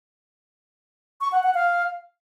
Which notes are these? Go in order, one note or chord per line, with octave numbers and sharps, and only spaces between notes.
C#6
F#5
F#5
F5